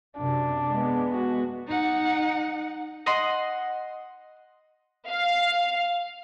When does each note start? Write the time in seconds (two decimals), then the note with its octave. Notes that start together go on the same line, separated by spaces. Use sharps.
0.18 F#2 C3 D4
0.69 G#3 B3
1.12 F#4
1.67 D#4 F#5
3.06 D#5 F#5 C6
5.09 F5